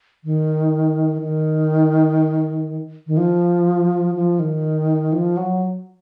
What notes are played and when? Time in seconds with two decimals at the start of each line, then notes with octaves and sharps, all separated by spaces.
0.24 D#3
1.22 D#3
3.07 D#3
3.17 F3
4.15 F3
4.39 D#3
5.13 F3
5.37 F#3